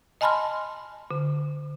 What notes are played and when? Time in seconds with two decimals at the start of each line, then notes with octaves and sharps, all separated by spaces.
0.21 D#5 G#5 A5 B5 C6 F6
1.11 D3